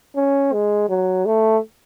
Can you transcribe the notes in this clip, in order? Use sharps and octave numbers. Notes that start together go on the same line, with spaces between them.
C#4
G#3
F#3
A3